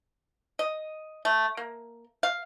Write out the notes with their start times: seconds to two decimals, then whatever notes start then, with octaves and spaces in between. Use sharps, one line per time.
0.59 D#5
1.25 A3
1.57 A#3
2.23 F5